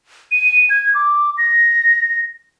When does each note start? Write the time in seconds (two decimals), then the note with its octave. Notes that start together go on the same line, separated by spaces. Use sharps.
0.31 D#7
0.70 G#6
0.95 D6
1.38 A#6